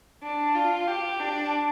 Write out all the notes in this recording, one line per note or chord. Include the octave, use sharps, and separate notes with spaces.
D4
F4
G4
D4